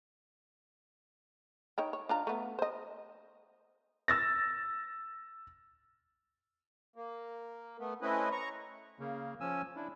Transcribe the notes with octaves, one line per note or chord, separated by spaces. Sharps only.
D#4 C#5 G5
C#5
D4 F4 A#5
A3 B3
C5 D#5
E6 A6 A#6
A#3
A3 B3
A3 C4 C#4 E4 B4 D#5
A#5 C#6
C#3 A#3
F3 C#4 G#5 E6
D4 E4